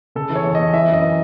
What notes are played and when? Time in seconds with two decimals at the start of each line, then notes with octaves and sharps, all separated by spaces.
0.15 C#3 A4
0.30 E3
0.36 C#5
0.45 E2
0.55 E2 D#5
0.73 E3 E5
0.88 F#2
0.93 D#5
1.02 E3